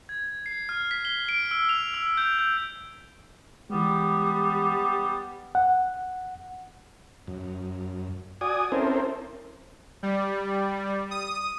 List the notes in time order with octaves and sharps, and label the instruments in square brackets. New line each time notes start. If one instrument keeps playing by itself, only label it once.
[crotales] G#6
C7
F6
B6
G7
D7
E6
F7
E6
G6
G6
[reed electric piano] E3 G#3 [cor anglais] G3 [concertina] B3 [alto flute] G4
[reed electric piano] F#5
[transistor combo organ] F#2
F#4 D5 G#5 D#6
C4 C#4 E4 A4 A#4 C5
[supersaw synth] G3
D#6